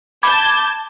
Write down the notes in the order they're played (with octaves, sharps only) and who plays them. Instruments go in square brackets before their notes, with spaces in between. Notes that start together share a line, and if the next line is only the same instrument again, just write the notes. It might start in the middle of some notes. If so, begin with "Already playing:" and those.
[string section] A5 G6 [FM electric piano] B5 D6 G#6